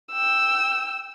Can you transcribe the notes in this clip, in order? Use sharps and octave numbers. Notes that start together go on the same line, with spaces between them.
G5 E6